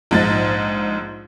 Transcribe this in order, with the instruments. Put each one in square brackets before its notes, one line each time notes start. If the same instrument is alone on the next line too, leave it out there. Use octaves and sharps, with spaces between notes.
[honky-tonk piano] A#1 G#2 A6